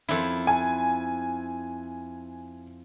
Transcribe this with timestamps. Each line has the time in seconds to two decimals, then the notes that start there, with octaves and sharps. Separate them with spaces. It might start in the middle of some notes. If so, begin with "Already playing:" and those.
0.09 F2 E4
0.47 G#5